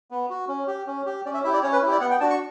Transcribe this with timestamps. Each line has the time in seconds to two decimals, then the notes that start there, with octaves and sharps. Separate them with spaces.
0.11 B3
0.30 F#4
0.48 C#4
0.67 G4
0.87 C#4
1.06 G4
1.26 C#4 D5
1.34 E5
1.44 E4 G4 E5
1.53 D5
1.63 C#4 C#5
1.72 B4
1.82 E4 G4
1.92 D5
2.01 B3 F#5
2.10 G5
2.20 D4 F#4 A5
2.30 C#6